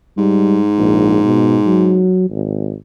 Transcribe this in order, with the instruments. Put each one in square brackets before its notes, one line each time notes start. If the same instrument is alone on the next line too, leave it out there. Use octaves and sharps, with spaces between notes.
[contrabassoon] G#2 [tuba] G3
[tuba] A#1
B2
F#3
G#1